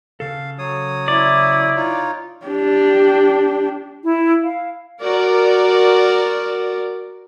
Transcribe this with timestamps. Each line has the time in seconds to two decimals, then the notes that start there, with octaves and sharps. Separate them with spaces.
0.20 C#3 A4 F5
0.58 F#3 C#5 D#6
1.08 E4 D5
1.76 D#4 F4 C#5
2.46 D4 G4
4.04 E4
4.43 F5
5.01 F#4 A#4 D5